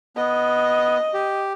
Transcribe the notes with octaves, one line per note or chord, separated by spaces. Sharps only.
B3 D#5
G4